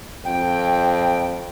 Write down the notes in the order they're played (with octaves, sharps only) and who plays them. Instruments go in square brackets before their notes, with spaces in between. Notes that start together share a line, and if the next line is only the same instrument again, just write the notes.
[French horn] F2 [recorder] G5